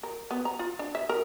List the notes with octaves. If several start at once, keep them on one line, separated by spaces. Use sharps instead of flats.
A#4
B3
A#5
F4
D4
E5
A#4